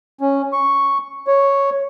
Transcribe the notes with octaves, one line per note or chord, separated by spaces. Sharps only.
C#4
C#6
C#5